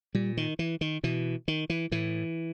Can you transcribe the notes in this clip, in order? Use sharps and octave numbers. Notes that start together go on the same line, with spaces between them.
A#2 G3
D#3
E3
D#3
B2 E3
D#3
E3
A2 E3